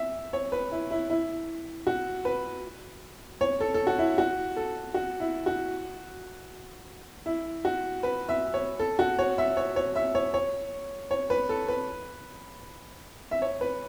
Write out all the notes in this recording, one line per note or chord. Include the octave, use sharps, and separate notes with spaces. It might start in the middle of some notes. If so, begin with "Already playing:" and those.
Already playing: E5
C#5
B4
E4
E4
E4
F#4
B4
C#5
A4
A4
F#4
E4
F#4
A4
F#4
E4
F#4
E4
F#4
B4
E5
C#5
A4
F#4
C#5
E5
C#5
C#5
E5
C#5
C#5
C#5
B4
A4
B4
E5
C#5
B4